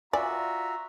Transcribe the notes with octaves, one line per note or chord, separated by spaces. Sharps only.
F4 F#4 D5 E5 G#5 A#5